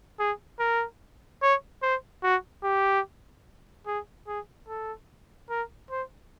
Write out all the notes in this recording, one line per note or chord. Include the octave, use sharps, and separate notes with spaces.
G#4
A#4
C#5
C5
F#4
G4
G#4
G#4
A4
A#4
C5